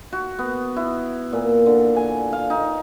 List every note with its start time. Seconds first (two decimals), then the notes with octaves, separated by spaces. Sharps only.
0.12 F#4
0.39 B3
0.76 E4
1.32 A#2
1.66 D3
1.96 G#5
2.33 F5
2.50 D#4